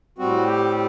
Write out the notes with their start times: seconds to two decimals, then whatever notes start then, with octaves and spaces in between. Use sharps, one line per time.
0.18 A2 G3 C4 F#4
0.47 G4